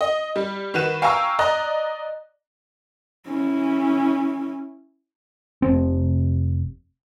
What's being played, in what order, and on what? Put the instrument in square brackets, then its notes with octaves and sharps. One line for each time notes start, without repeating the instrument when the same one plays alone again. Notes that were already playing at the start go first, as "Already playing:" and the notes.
[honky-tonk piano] D#5
G3
D#3 F#4 B4 E7
F5 G5 G#5 A#5 C#6 E6
D5 D#5 A#5 F#6
[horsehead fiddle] C#4 E4
[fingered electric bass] F1 C4